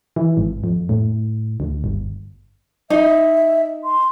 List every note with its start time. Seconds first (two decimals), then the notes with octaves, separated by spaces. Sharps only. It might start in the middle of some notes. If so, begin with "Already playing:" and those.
0.16 E3
0.37 G#1
0.64 F2
0.89 A2
1.60 D2
1.84 G1
2.90 D#4 E5
3.84 C6